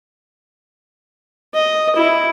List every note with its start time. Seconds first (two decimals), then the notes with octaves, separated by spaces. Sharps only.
1.54 D#5
1.96 E4